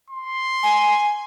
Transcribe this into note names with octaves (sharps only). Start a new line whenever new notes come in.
C6
G#5